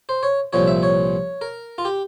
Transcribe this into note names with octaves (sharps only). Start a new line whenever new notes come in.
C5
C#5
C2 A#2 F3 C#5
E5
C#5
A#4
F4
G4